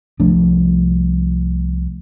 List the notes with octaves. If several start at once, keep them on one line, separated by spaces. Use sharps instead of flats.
C2 F3 A3 D4